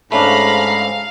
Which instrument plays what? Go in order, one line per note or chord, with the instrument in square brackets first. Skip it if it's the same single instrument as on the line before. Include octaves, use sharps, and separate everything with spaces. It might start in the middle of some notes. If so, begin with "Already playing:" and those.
[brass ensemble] G#2 [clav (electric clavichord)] A3 C#4 D4 [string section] F5 [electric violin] A#5 B5